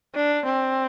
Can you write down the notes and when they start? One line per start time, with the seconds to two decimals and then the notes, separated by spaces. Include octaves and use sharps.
0.15 D4
0.45 C4